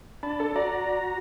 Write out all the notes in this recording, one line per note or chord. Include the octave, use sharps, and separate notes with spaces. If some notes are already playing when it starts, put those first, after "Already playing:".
D4 A5 B5
A4
F#4 D5 A#5